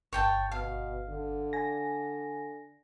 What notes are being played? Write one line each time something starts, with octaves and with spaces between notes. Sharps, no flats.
G1 C#5 G5 A5
B2 F5
D3
G#5 A#6